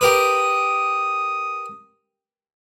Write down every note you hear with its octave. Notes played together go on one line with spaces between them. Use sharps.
G4 A#4 B4 D#6